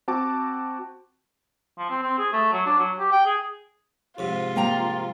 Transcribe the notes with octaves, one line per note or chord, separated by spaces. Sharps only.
C4 F#4 A5 D6
F3
C4
C4
G#4
A3
F#3
D4
F#3
G4
G5
G#4
F2 G#2 C3 F4
A#3 G5 A#5